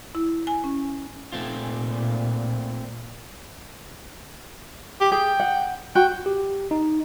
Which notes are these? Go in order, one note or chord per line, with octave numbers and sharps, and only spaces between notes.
E4
G#5
C#4
A#2 A3 C4 F4
G4
G#4 G5
F#5
F#4 G5
G4
D#4